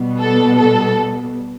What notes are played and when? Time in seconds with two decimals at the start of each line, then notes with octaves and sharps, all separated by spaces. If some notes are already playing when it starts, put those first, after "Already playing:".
Already playing: B2 G3 B3
0.20 A4
0.57 A4